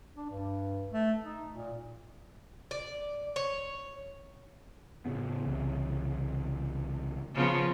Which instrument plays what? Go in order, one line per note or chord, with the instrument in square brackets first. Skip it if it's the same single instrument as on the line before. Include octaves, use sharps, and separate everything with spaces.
[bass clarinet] D4
G2
A3
D#4
A#2
[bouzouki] D5
C#5
[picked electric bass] A2 C#3 B3
C2 C#3 E3
[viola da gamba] C#3 F3 B3